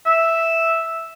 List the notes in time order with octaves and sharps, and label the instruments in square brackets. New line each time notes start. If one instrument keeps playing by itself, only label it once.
[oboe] E5